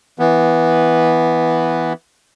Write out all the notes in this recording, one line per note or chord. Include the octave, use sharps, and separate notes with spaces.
E3 B3